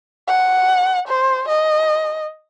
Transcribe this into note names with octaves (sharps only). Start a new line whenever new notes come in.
F#5
C5
D#5